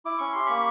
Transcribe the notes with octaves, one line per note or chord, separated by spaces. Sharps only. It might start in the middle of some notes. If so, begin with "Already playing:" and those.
E4 D6
C#4 C#6
G4 C6
A#3 B5 C#6